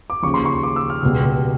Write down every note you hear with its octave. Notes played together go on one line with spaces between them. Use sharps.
D6
D#2 C#3 F3 C#6
C6
C#6
D6
E6
F6
C#2 B2 G3